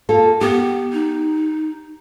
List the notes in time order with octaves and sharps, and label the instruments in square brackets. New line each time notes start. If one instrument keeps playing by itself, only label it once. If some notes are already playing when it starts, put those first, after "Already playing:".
[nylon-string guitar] A#3 F4 A4
[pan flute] B3 [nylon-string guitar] G4
[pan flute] D#4